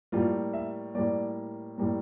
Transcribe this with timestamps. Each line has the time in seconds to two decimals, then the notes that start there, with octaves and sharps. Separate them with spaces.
0.12 A2 G3 A#3 F4
0.53 E5
0.95 A2 G3 A#3 D5
1.78 A2 G3 A#3